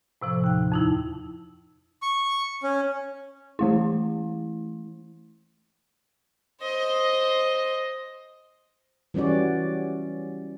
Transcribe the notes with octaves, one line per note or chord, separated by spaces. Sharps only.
A2 C3 F3
D#2 G5
F2 D#4 E4
C#6
C#4
E3 A3 E4
C5 D#5
E3 G3 C#4 F#4 D5